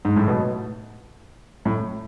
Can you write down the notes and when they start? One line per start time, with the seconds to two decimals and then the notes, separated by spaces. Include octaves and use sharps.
0.05 G#2
0.16 A2
0.28 B2
1.65 A2